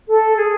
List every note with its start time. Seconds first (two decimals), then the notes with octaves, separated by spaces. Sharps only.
0.08 A4
0.37 G#4